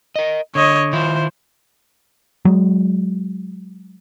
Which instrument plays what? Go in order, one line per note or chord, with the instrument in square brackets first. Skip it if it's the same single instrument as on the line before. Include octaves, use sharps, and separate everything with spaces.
[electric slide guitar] A#4 D#5
[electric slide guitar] D3 [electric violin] C#5 D#5
[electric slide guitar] D#3 E4 F4 [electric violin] C5
[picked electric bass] F#3 G#3